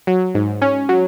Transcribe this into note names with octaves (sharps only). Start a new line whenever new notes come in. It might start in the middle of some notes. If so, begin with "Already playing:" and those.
F#3
G#2
C#4
F#3